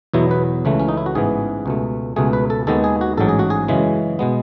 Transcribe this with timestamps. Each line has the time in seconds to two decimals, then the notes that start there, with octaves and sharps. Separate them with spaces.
0.14 E2 B2 F#3 B3 E4
0.31 B4
0.65 C#2 C#3 E3 A3
0.80 C#4
0.88 D#4
0.97 E4
1.06 F#4
1.15 A1 G#2 E3 B3 G#4
1.66 C#2 B2 A3
2.16 C#2 B2 A3 G#4
2.33 B4
2.50 A4
2.67 D#2 D#3 G#3 B3 A4
2.84 G#4
3.01 F#4
3.18 A1 G#2 F#3 A4
3.28 G#4
3.39 F#4
3.50 G#4
3.68 F#2 C#3 E3 G#3
4.19 B2 G#3 B3